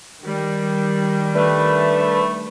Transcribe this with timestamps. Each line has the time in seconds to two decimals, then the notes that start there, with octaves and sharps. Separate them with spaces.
0.21 D#3 G3
1.35 A3 D4 B4